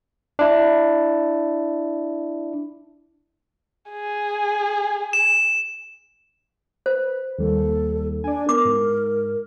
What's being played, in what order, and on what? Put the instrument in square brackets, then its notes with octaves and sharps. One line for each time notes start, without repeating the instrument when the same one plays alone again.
[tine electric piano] D4 E4
[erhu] G#4
[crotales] E7
[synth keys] B4 [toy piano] C5
[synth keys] D#2 G3 A#3 [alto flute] A4
[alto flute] D4 [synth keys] D5 G#5
[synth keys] B3 [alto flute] A#4 [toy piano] D6
[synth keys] G#2